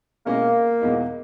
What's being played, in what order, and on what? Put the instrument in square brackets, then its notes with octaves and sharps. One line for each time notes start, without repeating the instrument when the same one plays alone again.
[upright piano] B2 G#3 C#4 E4 [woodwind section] A#3
[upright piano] E2 B2 G#3 B3 D#4